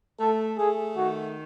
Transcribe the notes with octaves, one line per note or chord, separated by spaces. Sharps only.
A3 A4
A3 G#4
D#3 F#4